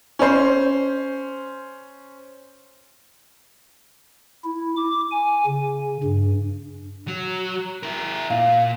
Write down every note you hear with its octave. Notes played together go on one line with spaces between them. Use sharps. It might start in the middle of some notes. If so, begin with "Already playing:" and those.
C#4 C5
E4
D6
G#5
C#3
G2
F#3
E4 A#4
A#2 F5